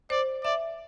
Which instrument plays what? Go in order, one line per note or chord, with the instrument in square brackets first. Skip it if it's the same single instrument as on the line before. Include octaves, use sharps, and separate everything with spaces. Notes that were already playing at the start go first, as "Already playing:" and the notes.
[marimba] C5 [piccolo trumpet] D5
[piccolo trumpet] D5 [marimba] E5